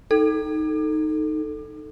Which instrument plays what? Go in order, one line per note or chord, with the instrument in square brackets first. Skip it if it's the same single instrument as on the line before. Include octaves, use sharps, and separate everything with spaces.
[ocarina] D#4 [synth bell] A4